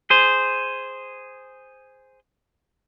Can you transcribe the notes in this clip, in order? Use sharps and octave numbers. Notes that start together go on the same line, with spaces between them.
G#4 C5